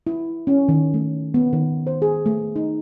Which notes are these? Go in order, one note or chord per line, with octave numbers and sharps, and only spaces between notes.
E4
C#4
D#3
A3
B3
D#3
C5
G#4
A3
D#4